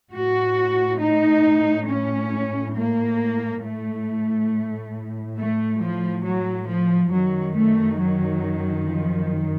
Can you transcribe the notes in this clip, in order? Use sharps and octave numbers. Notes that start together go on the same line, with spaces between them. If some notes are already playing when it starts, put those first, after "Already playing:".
A2 F#4
D#4
C#4
A#3
A2 A3
A3
F3
F#3
F3
F#2 D#3 F#3
A3
F#3
F3